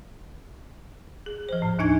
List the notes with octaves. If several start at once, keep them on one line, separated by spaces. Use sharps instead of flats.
G#4
F3 C5
A2
D#2 D4 D#4 G#5 G#6